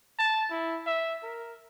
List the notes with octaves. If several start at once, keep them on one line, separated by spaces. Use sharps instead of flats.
A5
E4
E5
A#4